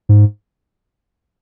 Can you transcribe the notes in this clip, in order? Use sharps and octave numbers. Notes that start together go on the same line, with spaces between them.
G#2